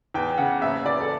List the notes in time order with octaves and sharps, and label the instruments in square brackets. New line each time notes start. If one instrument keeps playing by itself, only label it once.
[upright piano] E2 G5
C#3 F#5
F#1 E5
E2 D5
A4